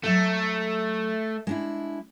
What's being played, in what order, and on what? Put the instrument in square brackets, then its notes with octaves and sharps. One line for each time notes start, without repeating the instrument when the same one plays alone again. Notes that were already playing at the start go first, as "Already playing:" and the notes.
[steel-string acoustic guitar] F#3 E5 A5 [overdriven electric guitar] A3
[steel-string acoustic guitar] G#3 D4 E4